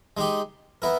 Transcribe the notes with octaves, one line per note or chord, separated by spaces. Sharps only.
G#3 D#4 G4
B3 E4 A#4